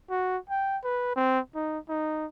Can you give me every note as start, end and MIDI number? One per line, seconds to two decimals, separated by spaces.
0.10 0.37 66
0.50 0.78 79
0.84 1.15 71
1.16 1.39 60
1.55 1.78 63
1.89 2.25 63